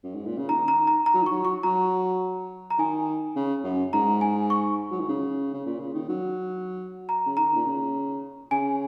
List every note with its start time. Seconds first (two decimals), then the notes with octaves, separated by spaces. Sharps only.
0.04 F#2
0.15 G#2
0.26 A#2
0.37 C#3
0.49 D#3 A#5
0.68 A#5
0.87 A#5
1.06 A#5
1.14 F#3
1.23 D#3
1.26 F#3 C#6
1.45 C#6
1.63 F#3 A#5
2.70 A#5
2.78 D#3 G#5
3.36 C#3
3.64 F#2
3.93 G#2 A#5
4.21 G#5
4.50 C#6
4.91 F#3
5.00 D#3
5.08 C#3
5.53 C#3
5.66 A#2
5.79 C#3
5.94 D#3
6.09 F#3
7.09 A#5
7.26 C#3
7.37 D#3 A#5
7.56 A#2
7.65 C#3
8.51 C#3 G#5